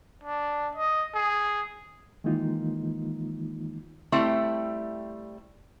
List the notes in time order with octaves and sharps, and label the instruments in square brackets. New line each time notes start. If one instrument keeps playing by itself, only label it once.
[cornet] D4
D#5
G#4
[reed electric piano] D#3 E3 G#3 A#3 D#4 F4
[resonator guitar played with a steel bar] G3 A3 C4 E4